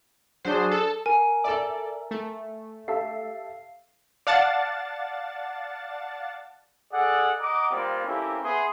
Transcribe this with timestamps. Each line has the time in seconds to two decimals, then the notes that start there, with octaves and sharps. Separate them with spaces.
0.45 F#3 D4 G#4 C5
0.71 A4
1.06 A#4 G#5
1.44 A4 D5 E5 E6
2.11 A3
2.88 G4 A4 E5 F5 C7
4.27 D5 F5 F#5 A5 A6
6.92 G#4 A4 D5 F#5
7.39 D#5 F#5 A#5 D6
7.71 G3 A#3 C4 F4
8.06 A#3 C4 C#4 E4 G4 A4
8.42 B3 G#4 E5 C6